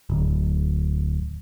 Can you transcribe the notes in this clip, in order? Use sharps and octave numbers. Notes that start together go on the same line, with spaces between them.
D1